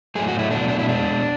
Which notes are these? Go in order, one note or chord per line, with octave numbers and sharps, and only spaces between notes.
A2 F#3 A3 G#4
F#4
E4
B2 F#3 A3 D4
D4
E4
B2 G#3 D4